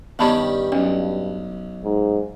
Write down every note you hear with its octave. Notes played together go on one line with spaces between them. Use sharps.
G2 D#3 G3 B3 C#4 A5 B5
B1 C#4
G#2